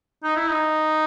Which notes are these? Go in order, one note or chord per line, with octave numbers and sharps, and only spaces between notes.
D#4
E4
D#4